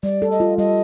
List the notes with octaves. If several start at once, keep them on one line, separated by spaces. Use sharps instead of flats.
G3 D5
A4
D#5
F4
G3 D#5